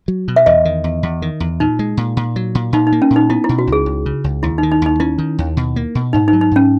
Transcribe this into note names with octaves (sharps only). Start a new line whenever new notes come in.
F#3
B2
E5
E2 D#5
D#3
E2
E2
D#3
E2
A#2 D#4
G#3
A#2
A#2
F#3
A#2
A#2 D#4
D#4
A#3
C#4
A#2
D#4
B3 E4
E4
B2
F#4
C#2
G#4
C#2
C#3
C#2
D#2 E4
D#4
D#3
D#4
D#2 D#4
C#4 E4
D#3
D#2
B2
A#3
B2
G#2 D#4
D#4
F#3
D#4
G#2 C#4